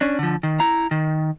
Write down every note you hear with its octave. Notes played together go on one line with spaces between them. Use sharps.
C#4 D4
D3 F3
D#3
E4 A#5
D#3